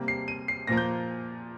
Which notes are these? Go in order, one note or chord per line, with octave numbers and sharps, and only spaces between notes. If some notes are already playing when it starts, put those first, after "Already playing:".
Already playing: C3 G3 A#3
C7
D#7
C7
A#2 F3 A#3 A#6
G6